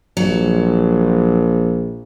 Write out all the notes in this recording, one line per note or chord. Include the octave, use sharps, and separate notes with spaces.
A#1 F#3